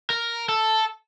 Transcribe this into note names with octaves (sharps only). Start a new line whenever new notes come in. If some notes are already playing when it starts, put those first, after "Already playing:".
A#4
A4